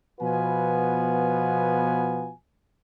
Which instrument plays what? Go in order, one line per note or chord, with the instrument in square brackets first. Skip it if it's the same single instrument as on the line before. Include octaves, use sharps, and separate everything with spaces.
[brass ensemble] B2 F3 B3 F4 B4 G#5